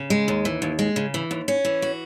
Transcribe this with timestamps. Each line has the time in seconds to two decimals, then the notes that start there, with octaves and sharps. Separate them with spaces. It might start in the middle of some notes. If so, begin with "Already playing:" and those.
Already playing: C#3
0.10 G#3
0.28 D#2
0.45 E3
0.62 D#2
0.79 G#3
0.96 C#3
1.14 E3
1.31 D#2
1.48 C#4
1.65 E3
1.82 F#4